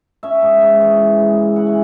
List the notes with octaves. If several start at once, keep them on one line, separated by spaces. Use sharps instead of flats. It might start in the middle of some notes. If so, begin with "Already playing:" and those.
C#4 E5
G#2
G#2
E3
C#4
G#3
C#3
E4 F#5
G#5